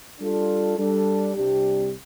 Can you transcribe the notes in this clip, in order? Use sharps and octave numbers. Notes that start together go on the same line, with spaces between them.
G3 D4 F4 A4
G3 D4 A4
C2 C3 G3 D4 G4